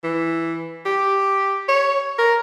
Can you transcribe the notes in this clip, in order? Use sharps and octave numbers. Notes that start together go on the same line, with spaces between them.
E3
G4
C#5
A#4